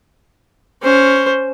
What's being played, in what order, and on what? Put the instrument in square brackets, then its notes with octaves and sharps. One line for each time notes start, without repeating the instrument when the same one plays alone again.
[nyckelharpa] C#4 C5